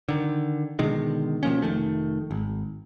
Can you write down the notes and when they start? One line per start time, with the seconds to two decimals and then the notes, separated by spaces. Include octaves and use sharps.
0.09 D3 D#3
0.79 B2 D3 D#3 G#3
1.43 B2 F3 A#3 C#4
1.62 F1 E2 D#3 A3
2.31 G#1